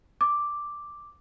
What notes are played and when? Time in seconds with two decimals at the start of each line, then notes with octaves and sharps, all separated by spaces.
0.21 D6